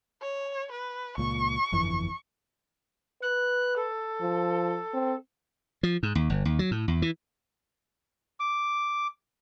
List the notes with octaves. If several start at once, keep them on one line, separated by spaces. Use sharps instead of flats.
C#5
B4
C#2 A#2 C#6
G1 F2 E3
B4 F#6
A4
F3
C4
F3
G#2
D#2
G1
D#2
F#3
A2
E2
E3
D6